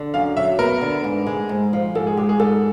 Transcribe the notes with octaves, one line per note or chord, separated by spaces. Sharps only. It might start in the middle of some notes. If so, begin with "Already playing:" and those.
Already playing: D3
F#2 F5
F#3 E5
B3 A#4
D3
G#2
G#3
G#2
F3
G#2 A4
G#4
G#3 G4
G#4
G#2 A4